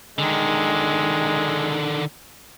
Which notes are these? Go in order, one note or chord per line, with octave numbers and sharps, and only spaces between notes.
D3 D#3 G#3